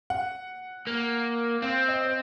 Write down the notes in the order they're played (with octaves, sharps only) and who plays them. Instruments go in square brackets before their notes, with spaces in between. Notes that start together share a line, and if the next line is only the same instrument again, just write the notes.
[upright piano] F#5
[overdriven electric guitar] A#3
[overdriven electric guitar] C4 [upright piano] F5
[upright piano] D#5
C5